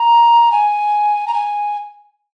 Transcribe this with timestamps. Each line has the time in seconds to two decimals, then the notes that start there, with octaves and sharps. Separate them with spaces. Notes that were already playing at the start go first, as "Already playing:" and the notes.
Already playing: A#5
0.52 G#5
1.28 A#5
1.34 G#5